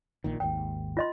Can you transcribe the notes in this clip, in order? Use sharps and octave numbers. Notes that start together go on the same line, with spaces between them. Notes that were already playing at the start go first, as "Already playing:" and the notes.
A#1 A#2 D#3
G#1 D#2 G#2 G5
F4 D#5 C6